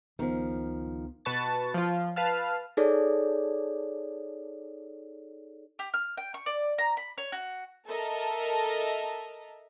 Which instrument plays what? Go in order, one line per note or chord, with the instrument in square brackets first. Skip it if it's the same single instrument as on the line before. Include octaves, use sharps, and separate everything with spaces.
[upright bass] C#2 B3 [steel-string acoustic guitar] D#3 F3
[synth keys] B2 B4 A5 C#6 A6
F3 F4
B4 F5 A5 F6
[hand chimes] D#4 G#4 A4 C#5 D5
[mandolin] G4
F6
G5
C#6
D5
A#5
B5
C#5
F#4
[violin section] A4 A#4 D#5 E5 A5 A#5